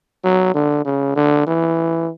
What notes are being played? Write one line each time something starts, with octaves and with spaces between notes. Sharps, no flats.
F#3
D3
C#3
D3
E3